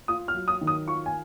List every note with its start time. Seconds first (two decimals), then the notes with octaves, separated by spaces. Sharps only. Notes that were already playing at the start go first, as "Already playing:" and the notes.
0.08 F4 D#6
0.28 F6
0.34 F#3
0.48 D#6
0.61 D#3
0.67 D#6
0.87 F4 C#6
1.06 G#5